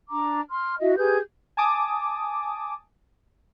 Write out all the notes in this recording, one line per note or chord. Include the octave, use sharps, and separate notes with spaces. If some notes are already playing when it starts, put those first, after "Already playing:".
D4 A#5 D6
C6 F6
E4 F#4 D#5 E5
G4 G#4 B4 G6
G#5 A5 D6 D#6